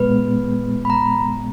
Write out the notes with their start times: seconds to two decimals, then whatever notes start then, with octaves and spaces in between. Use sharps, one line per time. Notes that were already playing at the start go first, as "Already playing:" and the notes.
Already playing: A#2 G#3 B3 B4
0.85 B5
0.90 A#5